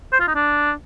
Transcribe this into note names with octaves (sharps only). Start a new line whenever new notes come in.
C5
F4
D#4
D4